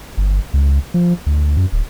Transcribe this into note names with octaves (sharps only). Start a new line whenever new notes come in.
G1
C#2
F3
D2
F#2
D1